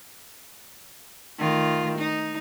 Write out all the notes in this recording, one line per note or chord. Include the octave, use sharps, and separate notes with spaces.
D#3 A3 F4
D#4